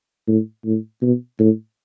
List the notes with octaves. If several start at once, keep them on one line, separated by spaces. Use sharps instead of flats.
A2
A2
B2
A2